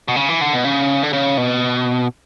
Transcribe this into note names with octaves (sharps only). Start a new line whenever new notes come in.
B2
C#3
E3
D3
B2
C#3
D3
C#3
B2